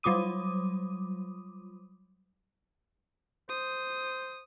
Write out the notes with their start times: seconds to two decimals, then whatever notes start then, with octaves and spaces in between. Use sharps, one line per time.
0.03 F#3 G3 F4 D6 D#6 D#7
3.50 C5 D#6